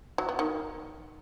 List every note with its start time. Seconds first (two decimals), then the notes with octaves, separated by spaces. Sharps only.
0.18 F#3
0.29 B3
0.39 D#3